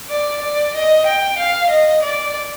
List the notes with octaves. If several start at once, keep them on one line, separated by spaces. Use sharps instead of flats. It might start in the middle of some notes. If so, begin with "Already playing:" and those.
D5
D5
D#5
G5
F5
D#5
D5